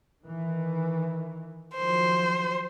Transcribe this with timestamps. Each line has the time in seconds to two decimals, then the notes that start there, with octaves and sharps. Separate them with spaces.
0.21 D#3 E3
1.76 D#3 F3 F#3 C5